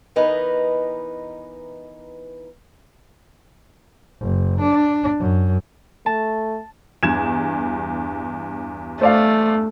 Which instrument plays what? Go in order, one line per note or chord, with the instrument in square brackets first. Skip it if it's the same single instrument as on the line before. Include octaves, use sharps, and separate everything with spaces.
[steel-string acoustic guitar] E3 B3 D#4 A#4 B4 D#5
[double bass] F#1
D4
F#2
[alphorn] A3 [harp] A5
[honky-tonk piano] E2 G2 [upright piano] G#6 E7
[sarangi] A3 [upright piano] C5 D5 F5